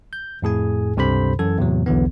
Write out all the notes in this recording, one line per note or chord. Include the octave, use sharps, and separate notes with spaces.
G6
F2 A2 G#4 G#5
C#2 G2 C3 A4 C5 B5
F#2 E3 A4 G#6
E2 A2 C3 F#3
B1 E2 D3 E3 B3